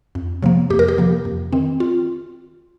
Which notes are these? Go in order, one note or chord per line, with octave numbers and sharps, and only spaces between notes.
F2
C3 F3 A#3
F2 G4
A#4
G4
C3 F3 A#3
F2
D#3 C4
F4